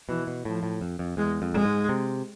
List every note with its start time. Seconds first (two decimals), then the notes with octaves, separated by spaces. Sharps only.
0.09 B2 E3
0.27 B2
0.45 A2 F3
0.63 A2
0.81 F2
0.99 F2
1.17 E2 G#3
1.42 F2
1.54 G#3
1.65 G#2
1.89 C3